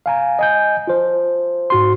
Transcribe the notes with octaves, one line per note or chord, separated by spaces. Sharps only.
F5 G#5 A#5
D#5 G#5 G6
F4 C5
G#2 F#4 C6